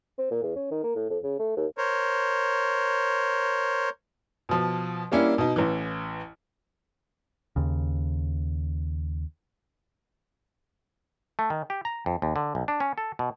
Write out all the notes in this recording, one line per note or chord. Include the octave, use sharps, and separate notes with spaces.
C4
A#2
E2
C#4
D#3
A#3
A2
F2
C#3
A3
D#2
A#4 C5 C#5
B2 F3
G3 A#3 C#4 D4 E4
B2 D#4
A1 E3
D#2 C#3
A3
D#3
G4
A#5
F2
D#2
D3
B1
D4
C#4
A4
B2